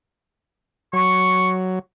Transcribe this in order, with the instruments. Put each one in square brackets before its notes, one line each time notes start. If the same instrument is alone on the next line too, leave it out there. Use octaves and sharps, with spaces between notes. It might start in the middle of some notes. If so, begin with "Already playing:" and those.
[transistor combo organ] F#3 [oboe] C#6